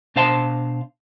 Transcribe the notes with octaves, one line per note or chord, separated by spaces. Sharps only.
B2 D4 C5 F5 A5 C6